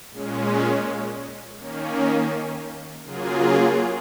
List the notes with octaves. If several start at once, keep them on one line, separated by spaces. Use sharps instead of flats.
A#2 G#3 C#4
D#3 A#3 C#4
C#3 F#3 A#3 F4 G#4